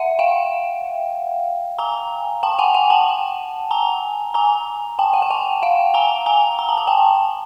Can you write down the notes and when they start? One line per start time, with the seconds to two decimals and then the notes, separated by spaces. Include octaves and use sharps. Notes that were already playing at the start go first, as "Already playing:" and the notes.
Already playing: E5 F#5
0.19 F5 G5
1.78 G#5 A#5
2.43 G5 A5
2.58 F#5 G#5
2.74 F#5 G#5
2.90 G5 A5
3.71 G#5 A#5
4.34 G#5 A#5
4.99 G5 A5
5.13 F#5
5.22 G5
5.30 F#5 G#5
5.62 F5 G5
5.94 G#5 A#5
6.26 G#5 A#5
6.59 A#5
6.69 A5
6.77 G#5
6.87 G5 A5